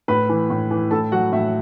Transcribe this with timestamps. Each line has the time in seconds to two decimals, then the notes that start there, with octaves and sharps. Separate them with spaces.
0.08 A2 B4 B5
0.29 E3
0.50 A2
0.71 E3
0.91 A2 A4 A5
1.12 F#3 F#4 F#5
1.33 A2 E5